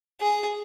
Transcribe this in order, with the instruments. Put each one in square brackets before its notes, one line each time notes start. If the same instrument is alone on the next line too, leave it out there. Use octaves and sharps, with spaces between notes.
[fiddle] G#4